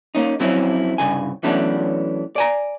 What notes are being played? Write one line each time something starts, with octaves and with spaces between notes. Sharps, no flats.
A#3 C#4 D#4
F2 F#3 C4 C#4 E4
C2 G2 C#3 G#5
E3 F#3 A3 B3 C#4 D4
D5 G#5 A#5